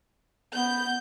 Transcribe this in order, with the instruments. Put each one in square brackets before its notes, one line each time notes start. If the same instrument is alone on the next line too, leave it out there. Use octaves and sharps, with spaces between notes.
[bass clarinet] B3 [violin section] G6